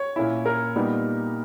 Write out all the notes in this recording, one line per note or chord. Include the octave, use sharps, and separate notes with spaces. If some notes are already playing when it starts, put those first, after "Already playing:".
Already playing: C#5
A#2 A#3 C#4 E4
A#4
A#2 G3 B3 D#4